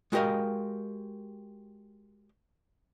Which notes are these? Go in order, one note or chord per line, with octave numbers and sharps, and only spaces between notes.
G#3 F#4 G4 A#4 D#5 F5